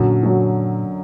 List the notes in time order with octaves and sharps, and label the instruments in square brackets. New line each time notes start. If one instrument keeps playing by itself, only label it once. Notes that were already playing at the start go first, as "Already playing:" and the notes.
Already playing: [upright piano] F#2 D3 F#3 [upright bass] A#2
[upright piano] F#2 D3 F#3